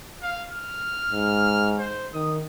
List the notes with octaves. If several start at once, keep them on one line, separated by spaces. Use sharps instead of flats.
F5
F6
G#2
C5
D#3 D#6